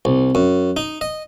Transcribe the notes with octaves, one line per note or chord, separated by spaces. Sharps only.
C2
F#2
D#4
D#5